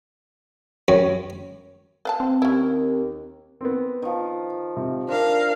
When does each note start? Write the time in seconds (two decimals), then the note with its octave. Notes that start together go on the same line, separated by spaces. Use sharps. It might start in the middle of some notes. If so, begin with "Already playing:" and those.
0.88 F#2
2.05 B4 F5 A5
2.20 C4
2.42 D#2 C#4 E4
3.61 B3 C4
4.02 D#3 F3
4.77 C3
5.08 D4 A#4 C5 F5